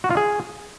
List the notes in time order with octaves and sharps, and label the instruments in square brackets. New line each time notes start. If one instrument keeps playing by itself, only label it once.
[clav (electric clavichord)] F#4
F4
G#4